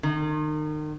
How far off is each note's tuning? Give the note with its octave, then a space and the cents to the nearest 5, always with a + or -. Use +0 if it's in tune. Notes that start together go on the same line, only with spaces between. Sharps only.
D#3 -35